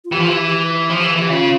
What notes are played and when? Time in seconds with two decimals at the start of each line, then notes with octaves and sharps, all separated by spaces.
0.05 F4
0.12 E3 G4
0.20 F3
0.28 E3 G4
0.51 G4
0.90 F3
1.03 E3
1.16 E3
1.28 C#3 F4